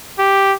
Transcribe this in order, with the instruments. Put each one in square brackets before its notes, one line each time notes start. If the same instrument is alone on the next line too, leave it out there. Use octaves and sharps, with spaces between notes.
[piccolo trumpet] G4